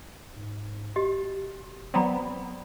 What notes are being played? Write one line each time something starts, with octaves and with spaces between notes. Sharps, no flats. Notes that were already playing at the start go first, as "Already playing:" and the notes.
G#2
E1 F#4 G4 D#5
F#3 B3 C4 D5 A#5 B5